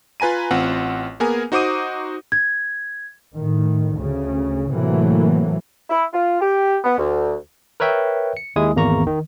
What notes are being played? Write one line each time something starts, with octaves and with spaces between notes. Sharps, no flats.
F4 B4 G#5 A#5 D#7
A1 C4 F4 F#5
A#3 B3 G#4 A#4 G#5
D#4 F#4 C5 D6 D#6 D#7
G#6
A2 D#3
D2 C#3
A2 C3 E3 F#3 A3 A#3
E4
F4
G4
B3
D2
A#4 B4 C#5 E5 G5
C#7
D#2 G#3 E4 G#5 D#6
G#1 E2 A#3 A#5 C#6
D#3